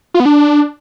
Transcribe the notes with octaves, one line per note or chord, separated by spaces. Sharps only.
F4
B3
D4